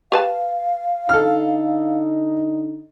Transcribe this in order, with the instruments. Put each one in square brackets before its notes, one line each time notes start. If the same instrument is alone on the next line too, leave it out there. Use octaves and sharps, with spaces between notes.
[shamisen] G4 B4 A5 [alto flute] F5
[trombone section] D3 D#4 [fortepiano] A4 F6